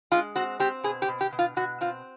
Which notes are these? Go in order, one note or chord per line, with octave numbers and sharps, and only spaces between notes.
G#3 F4
C4 F#4
C4 G4
B2 G#4
G4
B2
G4
B2
F4
B2 F#4
C4 F4